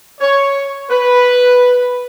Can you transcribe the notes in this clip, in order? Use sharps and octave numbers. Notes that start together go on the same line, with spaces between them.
C#5
B4